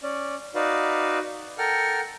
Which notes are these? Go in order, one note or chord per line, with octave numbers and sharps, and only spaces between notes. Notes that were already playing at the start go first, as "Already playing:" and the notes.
C#4 D5
D#4 F#4 B4 D5 F5
A4 A#4 F#5 G5 F6